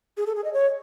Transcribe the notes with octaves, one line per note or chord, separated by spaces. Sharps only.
G#4
A4
G#4
D#5
C#5